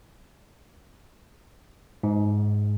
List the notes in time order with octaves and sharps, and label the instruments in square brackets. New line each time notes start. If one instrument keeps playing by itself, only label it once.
[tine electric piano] G#2